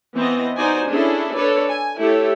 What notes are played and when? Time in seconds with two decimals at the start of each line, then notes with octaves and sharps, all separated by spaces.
0.16 E3 B3 C4 D#5
0.57 D#4 F#4 C5 D5 G#5
0.87 C#4 D4 E4 G#4 A4
1.35 D4 A4 B4 C#5 D5
1.71 G#5
1.99 A3 E4 G4 A4 C#5